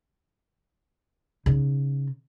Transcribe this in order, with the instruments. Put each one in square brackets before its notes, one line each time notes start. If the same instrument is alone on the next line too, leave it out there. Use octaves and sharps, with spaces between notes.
[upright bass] C#3 D#4